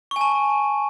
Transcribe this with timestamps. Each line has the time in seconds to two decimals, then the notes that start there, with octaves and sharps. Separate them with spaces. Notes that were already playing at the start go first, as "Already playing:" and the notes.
0.11 C#6
0.16 G#5
0.21 A5